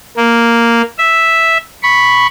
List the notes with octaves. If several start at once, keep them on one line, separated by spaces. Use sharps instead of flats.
A#3
E5
B5 C#6